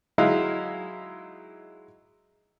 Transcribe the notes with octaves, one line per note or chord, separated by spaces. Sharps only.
F#3 G#3 D#4 E4 E5 F5